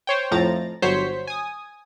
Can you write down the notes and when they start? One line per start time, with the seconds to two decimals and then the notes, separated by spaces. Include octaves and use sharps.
0.07 C5 C#5 G5
0.31 F2 A2 F3 A#5 A6
0.82 G1 F#3 C5 C#5 B6 C#7
1.27 G#5 D#6